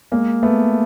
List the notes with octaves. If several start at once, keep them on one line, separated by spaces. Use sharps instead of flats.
G#3 A#3
A3 B3